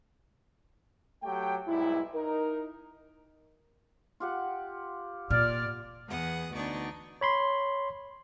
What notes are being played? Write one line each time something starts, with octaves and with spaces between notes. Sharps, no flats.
F#3 A3 G4 G5
B1 G#2 G3 E4
D#4 A#4
F4 G4 F#5
A#2 D5 F6
E2 B3 G#4 F#5 D#6
D2 B3 D4 D#4 D5 C#6
C#5 B5 C6